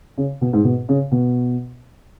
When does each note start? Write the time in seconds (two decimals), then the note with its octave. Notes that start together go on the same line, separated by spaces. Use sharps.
0.18 C#3
0.41 B2
0.53 G#2
0.64 B2
0.89 C#3
1.11 B2